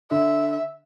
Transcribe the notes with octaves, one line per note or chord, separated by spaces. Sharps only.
D3 E5